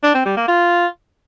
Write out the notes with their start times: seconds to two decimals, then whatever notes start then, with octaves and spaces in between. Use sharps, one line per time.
0.03 D4
0.14 C4
0.26 G3
0.37 A#3
0.48 F4